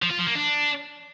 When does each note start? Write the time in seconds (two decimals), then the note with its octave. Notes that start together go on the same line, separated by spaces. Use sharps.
0.02 F3
0.11 F4
0.19 F3
0.27 A#3
0.35 D4